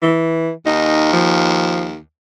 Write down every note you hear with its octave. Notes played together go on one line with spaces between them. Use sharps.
E3
D#2 D#4
F3